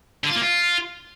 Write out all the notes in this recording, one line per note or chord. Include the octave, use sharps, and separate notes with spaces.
D3
F4
A#3
F4